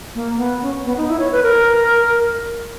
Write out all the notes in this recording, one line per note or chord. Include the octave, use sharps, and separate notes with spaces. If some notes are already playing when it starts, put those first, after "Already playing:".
A#3
B3
C#4
B3
D#4
E4
C#5
B4
A#4